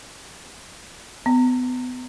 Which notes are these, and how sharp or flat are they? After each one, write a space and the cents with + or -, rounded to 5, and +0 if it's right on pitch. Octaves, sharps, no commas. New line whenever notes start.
B3 +30